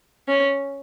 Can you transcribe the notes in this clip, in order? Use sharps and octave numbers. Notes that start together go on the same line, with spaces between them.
C#4